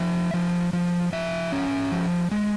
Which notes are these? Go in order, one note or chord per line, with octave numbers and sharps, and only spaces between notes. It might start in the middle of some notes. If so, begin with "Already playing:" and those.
Already playing: F3 E5
F3
F3
F3 E5
C#4
F3
G#3